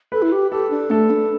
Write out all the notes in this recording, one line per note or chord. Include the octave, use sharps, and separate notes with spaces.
A4 B4
E4
G4
G4 A4
D4
A3 A4
D4